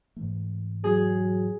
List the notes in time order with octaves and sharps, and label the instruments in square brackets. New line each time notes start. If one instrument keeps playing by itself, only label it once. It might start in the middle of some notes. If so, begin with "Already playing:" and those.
[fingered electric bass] G#2 E3 A3
[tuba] F#3 [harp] G#4